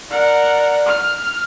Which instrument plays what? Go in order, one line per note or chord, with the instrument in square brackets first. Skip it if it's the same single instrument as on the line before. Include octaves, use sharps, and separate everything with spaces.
[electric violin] A#4 F#5 [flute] D5
[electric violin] F6